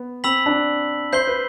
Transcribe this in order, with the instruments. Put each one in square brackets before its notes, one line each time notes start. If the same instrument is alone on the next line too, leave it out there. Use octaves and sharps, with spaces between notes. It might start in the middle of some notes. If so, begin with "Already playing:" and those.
Already playing: [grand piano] B3
[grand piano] C4 [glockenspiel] B5 E6 B6 F#7
[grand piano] D4
[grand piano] C5 [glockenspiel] G6 C7 G7
[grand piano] B4